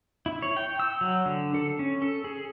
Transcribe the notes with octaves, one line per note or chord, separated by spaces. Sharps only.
E4
C#5
G5
E6
F#3
D3
A4
C#4
A4
G#4